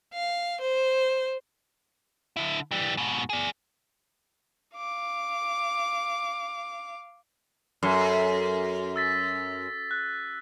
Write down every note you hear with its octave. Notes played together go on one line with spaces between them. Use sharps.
F5
C5
D3 E4
E3 G3
G#2 B2
G#4 D5
F5 D6
F#2 A4 B5 F6
E6 A6 B6
F#6